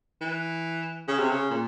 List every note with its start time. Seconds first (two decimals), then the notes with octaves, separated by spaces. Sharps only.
0.21 E3
1.08 C#3
1.19 C3
1.30 C#3
1.51 A#2